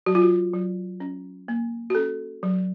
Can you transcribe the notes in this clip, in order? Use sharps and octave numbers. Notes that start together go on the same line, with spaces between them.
F#3 F#4
F4
F#4
F#3
C#4
A#3
F#4
C#4 A4
F#3